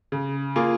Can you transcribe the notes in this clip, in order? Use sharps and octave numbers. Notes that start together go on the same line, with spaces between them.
C#3
A#3 F4 G#4